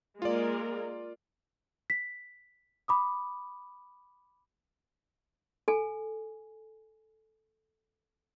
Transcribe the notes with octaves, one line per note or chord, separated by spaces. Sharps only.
G#3 A#3 F4 A#4 D5
B6
B5 D6 D#6
A4 G#5